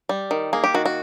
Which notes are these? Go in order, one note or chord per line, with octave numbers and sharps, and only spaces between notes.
G3
D#3
A#3 G#4
G4
D#3 F#4
F#4